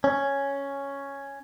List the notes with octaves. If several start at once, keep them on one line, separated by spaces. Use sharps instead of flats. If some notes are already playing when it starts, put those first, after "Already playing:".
C#4